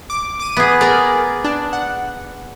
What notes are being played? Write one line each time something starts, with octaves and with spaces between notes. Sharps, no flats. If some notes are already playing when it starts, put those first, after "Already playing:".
D6
D6 D#7
B3 G#4
G#4 A#4 D5
D4
F#5